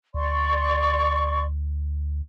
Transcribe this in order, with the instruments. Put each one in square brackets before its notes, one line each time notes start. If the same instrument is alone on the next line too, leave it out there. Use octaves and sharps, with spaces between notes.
[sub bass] D2 [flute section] D5 C6 C#6